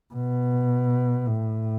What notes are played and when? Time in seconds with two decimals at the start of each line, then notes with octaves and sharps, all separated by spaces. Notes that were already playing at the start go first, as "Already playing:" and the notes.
0.14 B2
1.27 A2